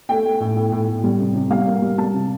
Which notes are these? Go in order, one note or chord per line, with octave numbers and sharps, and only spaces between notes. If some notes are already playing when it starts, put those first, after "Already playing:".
A3 G5
A3
A2
A2
A2
A2
G3
C3
C3
G3 F5
A#3
G3
G3 A5
C3